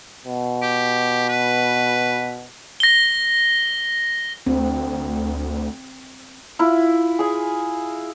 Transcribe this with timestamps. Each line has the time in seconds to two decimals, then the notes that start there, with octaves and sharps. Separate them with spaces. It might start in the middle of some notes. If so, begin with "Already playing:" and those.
0.25 B2
0.62 G4
1.29 B4
2.80 A#6 G7
4.47 D2 C4
6.59 E4 F4
7.19 G#4 G#5